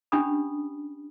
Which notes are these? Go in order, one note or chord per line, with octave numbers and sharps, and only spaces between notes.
C#4 D4 G4 B5 D#6